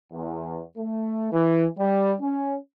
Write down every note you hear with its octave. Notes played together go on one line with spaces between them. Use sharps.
E2
A3
E3
G3
C#4